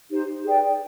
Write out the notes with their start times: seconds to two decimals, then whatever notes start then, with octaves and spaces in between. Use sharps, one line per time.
0.10 D#4 G4 C5
0.44 G#4 B4 D5 G5